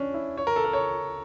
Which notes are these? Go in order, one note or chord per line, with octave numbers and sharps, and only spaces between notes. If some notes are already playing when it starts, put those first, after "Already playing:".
Already playing: C#4 D4
E4
C#5
A#4
A4
A#4
C#5